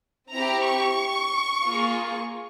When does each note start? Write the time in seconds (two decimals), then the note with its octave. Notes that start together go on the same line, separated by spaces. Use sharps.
0.31 C4 E4 G4 A#5
0.65 C#6
1.66 A#3 F4 G#4